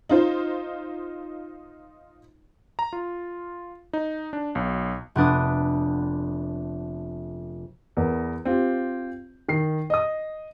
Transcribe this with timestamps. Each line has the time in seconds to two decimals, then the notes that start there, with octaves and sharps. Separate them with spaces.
0.09 D#4 F4 C5
2.79 A#5
2.93 F4
3.93 D#4
4.33 D4
4.55 B1
5.15 F1 B3 D4 D#6
7.97 E2 B3 A#4
8.45 C4 F4 G4
9.48 D#3 C7
9.90 D#5 D#6